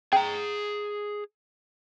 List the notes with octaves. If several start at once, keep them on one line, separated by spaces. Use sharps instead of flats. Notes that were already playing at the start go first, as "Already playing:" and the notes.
G#4 G5 A#5